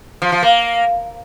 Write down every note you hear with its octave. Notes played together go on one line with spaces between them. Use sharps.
F3
F3
A#3